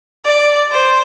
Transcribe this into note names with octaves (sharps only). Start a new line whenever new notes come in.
D5
C5